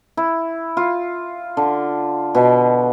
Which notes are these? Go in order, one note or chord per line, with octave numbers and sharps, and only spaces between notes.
E4
F4
D3
B2